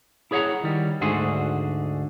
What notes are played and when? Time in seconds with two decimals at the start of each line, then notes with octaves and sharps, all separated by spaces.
0.31 E4 G#4 C#5 E5 F#5 A#5
0.63 D#3 G3
1.01 D2 G#2 D3 F#4 G#4 C5